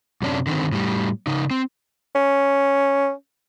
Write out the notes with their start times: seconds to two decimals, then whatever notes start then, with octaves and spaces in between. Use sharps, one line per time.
0.22 F#2 C3 C#4 D4
0.47 D3 D#3 C4
0.72 A2 G3
1.27 C#3 D#4
1.51 C4
2.15 C#4